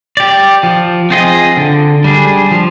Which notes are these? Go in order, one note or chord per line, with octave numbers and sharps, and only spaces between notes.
G4 D5
F3
C4 F4 G#4 D#5
D3
G3 D4 G#4
F3